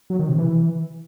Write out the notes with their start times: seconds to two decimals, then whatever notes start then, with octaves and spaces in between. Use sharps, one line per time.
0.10 F#3
0.19 D#3
0.29 C3
0.38 E3